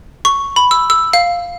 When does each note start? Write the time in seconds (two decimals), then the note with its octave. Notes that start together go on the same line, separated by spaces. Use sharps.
0.25 C#6
0.56 B5
0.71 E6
0.90 E6
1.13 F5